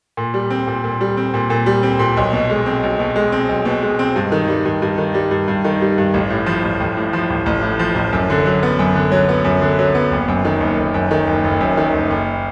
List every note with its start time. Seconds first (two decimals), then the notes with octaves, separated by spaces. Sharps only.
0.17 A#2
0.34 G3
0.50 C4
0.67 A#2
0.84 A#2
1.01 G3
1.17 C4
1.34 A#2
1.50 A#2
1.66 G3
1.83 C4
1.99 A#2
2.17 B1
2.33 B2
2.50 G#3
2.66 C4
2.83 B1
2.99 B2
3.16 G#3
3.32 C4
3.49 B1
3.65 B2
3.82 G#3
3.99 C4
4.16 G2
4.32 D#3
4.48 G3
4.65 G2
4.82 G2
4.98 D#3
5.14 G3
5.31 G2
5.48 G2
5.64 D#3
5.81 G3
5.98 G2
6.14 A1
6.30 A2
6.46 F3
6.63 A1
6.80 A1
6.97 A2
7.13 F3
7.30 A1
7.46 A1
7.62 A2
7.79 F3
7.95 A1
8.13 F#2
8.30 D3
8.46 F#3
8.63 B3
8.79 F#2
8.95 D3
9.12 F#3
9.29 B3
9.45 F#2
9.62 D3
9.79 F#3
9.95 B3
10.11 F#1
10.28 F#2
10.45 D#3
10.60 F#1
10.78 F#1
10.94 F#2
11.11 D#3
11.27 F#1
11.44 F#1
11.61 F#2
11.77 D#3
11.93 F#1
12.11 F#1